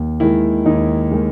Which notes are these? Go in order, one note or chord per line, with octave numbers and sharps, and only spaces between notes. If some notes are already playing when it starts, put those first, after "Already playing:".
Already playing: D#2
D#3 G#3 E4
D#2 D#4
D#3 G#3